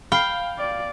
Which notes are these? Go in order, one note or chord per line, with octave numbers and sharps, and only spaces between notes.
F5 G5 B5 F6 C7
D5